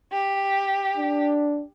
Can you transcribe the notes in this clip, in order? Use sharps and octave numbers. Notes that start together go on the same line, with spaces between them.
G4
D4